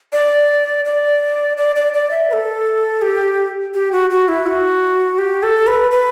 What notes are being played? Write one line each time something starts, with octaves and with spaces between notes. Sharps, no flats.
D5
D5
D5
D5
D5
E5
B4
A4
G4
G4
F#4
F#4
E4
F#4
G4
A4
B4
B4